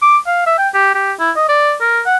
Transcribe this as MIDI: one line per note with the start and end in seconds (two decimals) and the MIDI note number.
0.02 0.17 86
0.27 0.45 77
0.47 0.55 76
0.58 0.69 79
0.74 0.95 67
0.95 1.12 67
1.19 1.31 64
1.36 1.44 75
1.49 1.74 74
1.81 2.01 70
2.06 2.17 78